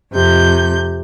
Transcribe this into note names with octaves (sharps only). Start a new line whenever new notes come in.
F2 C3 G6